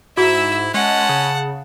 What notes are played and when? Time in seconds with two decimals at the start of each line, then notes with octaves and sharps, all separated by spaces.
0.17 G#2 E4 F#4 E5 E6
0.74 G#3 C#4 F#5 A5
1.09 C#3